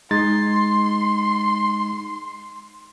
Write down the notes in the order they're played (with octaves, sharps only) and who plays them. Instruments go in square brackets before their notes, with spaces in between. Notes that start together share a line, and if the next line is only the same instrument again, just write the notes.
[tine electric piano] G#3 D#4 A6 [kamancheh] C6